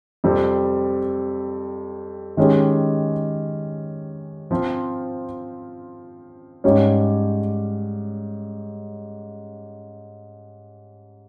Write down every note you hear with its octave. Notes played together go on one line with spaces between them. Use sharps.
F2 C3 G3 C4
D#3 G#3 C#4 G4
F3 C4 F4
G#2 G3 C#4 G4 C#5